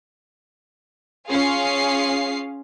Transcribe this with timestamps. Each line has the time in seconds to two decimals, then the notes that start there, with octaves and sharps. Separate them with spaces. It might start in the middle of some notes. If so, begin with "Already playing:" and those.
1.29 C#4 F4 G#4 F5 C7